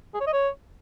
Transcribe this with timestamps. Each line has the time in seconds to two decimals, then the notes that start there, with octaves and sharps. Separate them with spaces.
0.14 G#4
0.20 C#5
0.27 D#5
0.33 C#5